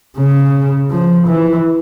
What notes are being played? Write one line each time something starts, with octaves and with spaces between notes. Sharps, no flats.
C#3
F3
E3